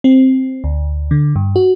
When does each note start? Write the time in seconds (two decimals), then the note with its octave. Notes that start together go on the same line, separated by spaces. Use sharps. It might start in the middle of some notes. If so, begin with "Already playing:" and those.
0.04 C4
0.64 D2
1.11 D3
1.36 G2
1.56 F#4